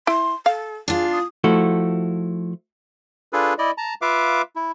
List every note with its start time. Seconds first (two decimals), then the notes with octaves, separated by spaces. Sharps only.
0.07 E4 C6
0.46 A4 F5
0.88 D4 F4 G#4
1.12 D#6
1.44 F3 A3 E4 F#4
3.32 D4 F4 G#4 A4 B4
3.59 E4 D5 D#5
3.78 A5 A#5
4.02 F4 B4 E5 F5 D6
4.56 E4